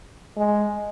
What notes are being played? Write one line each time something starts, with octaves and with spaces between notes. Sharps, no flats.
G#3